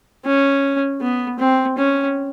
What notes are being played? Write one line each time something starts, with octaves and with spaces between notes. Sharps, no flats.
C#4
B3
C4
C#4